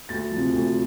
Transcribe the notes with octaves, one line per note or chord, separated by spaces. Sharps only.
D2 A6
C3 F3
D2